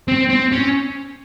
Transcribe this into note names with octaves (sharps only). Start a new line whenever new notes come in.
C4
C4
C#4